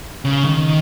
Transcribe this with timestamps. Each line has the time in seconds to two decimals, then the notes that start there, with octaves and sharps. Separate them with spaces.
0.25 C#3
0.45 D#3